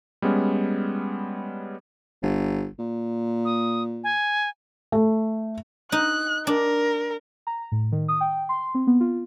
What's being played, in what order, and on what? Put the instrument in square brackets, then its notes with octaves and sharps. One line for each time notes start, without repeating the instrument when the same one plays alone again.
[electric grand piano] G3 G#3 B3 C#4
[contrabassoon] G1
A#2
[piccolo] D#6
G#5
[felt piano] A3
[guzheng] D#4 [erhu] F#6
[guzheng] D4 [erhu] A#4
[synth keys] A#5
A2
D#3
D#6
G5
C6
C4
B3
F4